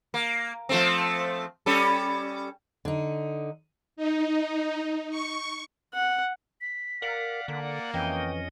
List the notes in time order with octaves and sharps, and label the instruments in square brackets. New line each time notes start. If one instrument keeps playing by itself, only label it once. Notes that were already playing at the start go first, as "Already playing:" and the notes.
[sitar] A#3
F3 A3 C4
G3 C#4 A4
[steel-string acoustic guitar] D3 D#4
[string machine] D#4
C#6
[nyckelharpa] F#5
[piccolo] B6
[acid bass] A#4 [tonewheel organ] D5 F#5 [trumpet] F5
[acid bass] D3 [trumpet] A#3
[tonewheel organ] F2 C#4 D#5 [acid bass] E3 [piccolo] G5